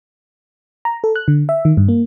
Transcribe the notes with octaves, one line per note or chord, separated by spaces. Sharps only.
A#5
A4
F#6
D3
E5
D#3
G2
A#3